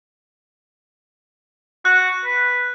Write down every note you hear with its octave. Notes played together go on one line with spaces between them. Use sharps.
F#4 F#6
B4